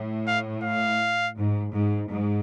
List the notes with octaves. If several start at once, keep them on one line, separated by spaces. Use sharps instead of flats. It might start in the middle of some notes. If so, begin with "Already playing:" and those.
Already playing: A2
F5
F5
G#2
G#2
G#2